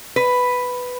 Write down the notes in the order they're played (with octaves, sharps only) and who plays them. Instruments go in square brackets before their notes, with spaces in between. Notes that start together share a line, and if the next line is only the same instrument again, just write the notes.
[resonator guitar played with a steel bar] B4